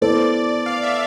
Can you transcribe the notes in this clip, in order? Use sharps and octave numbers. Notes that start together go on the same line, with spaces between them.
B3 E4 A4 C5 D5
F5
E5